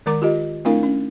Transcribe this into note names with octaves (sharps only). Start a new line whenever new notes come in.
D#3 G#3 A#4 A#5 D6
F4 G4 D#5
A3 C4 D4 E4 A#4 F5
C#4